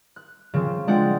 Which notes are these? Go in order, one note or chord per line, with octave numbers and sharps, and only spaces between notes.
F#6
C#3 F3 C4
G#3 D4 F4 F#5 G5